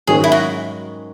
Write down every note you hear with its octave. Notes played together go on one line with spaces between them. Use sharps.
G#2 D#3 F#3 C#4 G#4
E4
F#4